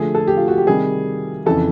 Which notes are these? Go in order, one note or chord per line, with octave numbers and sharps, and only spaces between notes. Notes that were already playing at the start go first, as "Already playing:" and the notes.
Already playing: D3 F3 A3 G#4
A4
G4
F4
F#4
G4
C3 D#3 G3 G#4
F2 C#3 E3 A4